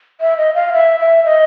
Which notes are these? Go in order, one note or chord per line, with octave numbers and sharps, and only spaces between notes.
E5
D#5
F5
E5
E5
D#5